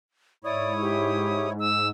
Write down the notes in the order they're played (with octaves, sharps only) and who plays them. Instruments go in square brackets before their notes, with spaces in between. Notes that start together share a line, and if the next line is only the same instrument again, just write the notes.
[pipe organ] G#2 [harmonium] E4 C#5 [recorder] D5 [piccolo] D#6
[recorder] G4
[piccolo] E6